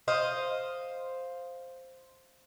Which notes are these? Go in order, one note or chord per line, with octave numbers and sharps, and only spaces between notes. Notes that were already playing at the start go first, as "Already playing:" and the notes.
C5 D#5 F5